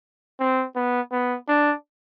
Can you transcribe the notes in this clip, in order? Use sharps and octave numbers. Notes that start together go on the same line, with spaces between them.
C4
B3
B3
D4